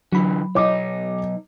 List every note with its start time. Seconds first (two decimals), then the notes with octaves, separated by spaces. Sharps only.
0.12 D3 E3 F#3 B5
0.55 B1 D#4 C#5 D#5 D6